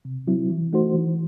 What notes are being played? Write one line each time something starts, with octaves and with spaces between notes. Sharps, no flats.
C3
F#3 C4 E4
E3
A3 D#4 F#4 C5
E3